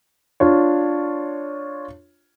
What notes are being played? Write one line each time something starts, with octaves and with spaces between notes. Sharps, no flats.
D4 F4 C#5